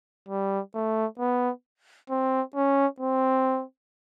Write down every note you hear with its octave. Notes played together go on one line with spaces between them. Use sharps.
G3
A3
B3
C4
C#4
C4